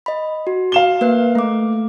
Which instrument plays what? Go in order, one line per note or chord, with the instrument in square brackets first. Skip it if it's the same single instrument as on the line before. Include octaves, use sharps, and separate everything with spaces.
[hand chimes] D#5 B5
F#4
[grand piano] F5 E7 G7
[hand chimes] A#3 B4 F#6
A3 D6